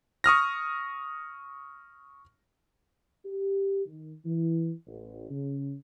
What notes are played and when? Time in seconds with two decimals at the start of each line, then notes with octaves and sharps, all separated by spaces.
0.24 C#6 D#6 F6 A#6
3.24 G4
3.86 D#3
4.25 E3
4.86 A1
5.30 C#3